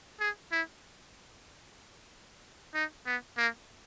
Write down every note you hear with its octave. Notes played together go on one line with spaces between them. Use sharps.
G#4
E4
D#4
B3
A#3